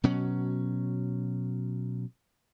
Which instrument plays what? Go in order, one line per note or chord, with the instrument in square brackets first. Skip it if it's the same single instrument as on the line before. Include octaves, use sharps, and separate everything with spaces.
[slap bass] B2 F#3 C#4